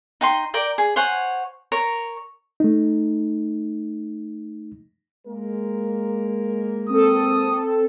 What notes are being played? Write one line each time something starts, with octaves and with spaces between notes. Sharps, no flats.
D#4 G5 C6
A#4 D5 G5 D6
G#4
C5 C#5 F#5 G#5
A#4 C#5 C#6
A3 D#4
G#3 A#3 A#4
C4 A4 D#6